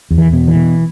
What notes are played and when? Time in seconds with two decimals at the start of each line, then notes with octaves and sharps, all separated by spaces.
0.11 E2
0.18 E3
0.33 B2
0.48 E3
0.55 B2